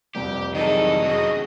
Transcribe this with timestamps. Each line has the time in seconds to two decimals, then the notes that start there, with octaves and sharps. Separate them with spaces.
0.15 F1 C2 F2 G4
0.55 D#3 E3 F#3 G#4 A4 D#5
1.01 F#2 A2 F#4 G#4